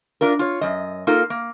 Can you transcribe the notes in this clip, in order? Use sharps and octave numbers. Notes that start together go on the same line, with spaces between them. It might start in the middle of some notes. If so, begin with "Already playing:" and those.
D4 F4 A#4
F4 C#5
F#2 D#5
A#3 D#4 F4 A4 A#4
A#3